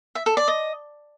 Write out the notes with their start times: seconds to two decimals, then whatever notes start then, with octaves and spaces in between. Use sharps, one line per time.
0.15 E5
0.26 A4
0.37 D5
0.48 D#5